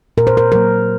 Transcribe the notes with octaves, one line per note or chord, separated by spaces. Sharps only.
A#2 A#4
C5
A#4
F#3 A#3 A#4